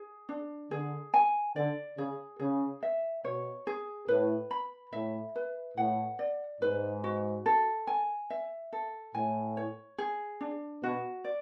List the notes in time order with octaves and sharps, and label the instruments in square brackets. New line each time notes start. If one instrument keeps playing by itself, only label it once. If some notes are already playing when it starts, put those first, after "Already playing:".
Already playing: [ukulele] G#4
D4
[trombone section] D3 [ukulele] G#4
[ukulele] G#5
[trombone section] D3 [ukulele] D5
[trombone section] C#3 [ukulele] G#4
[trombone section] C#3 [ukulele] G#4
[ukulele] E5
[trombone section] B2 [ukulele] C#5
[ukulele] G#4
[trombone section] A2 [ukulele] B4
[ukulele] B5
[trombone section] A2 [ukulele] E5
[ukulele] B4
[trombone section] A2 [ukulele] F#5
[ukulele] D5
[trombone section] G#2 [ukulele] B4
[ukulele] F#4
A4
G#5
E5
A4
[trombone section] A2 [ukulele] G#5
[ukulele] C#5
G#4
D4
[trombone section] B2 [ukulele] F#4
[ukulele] D5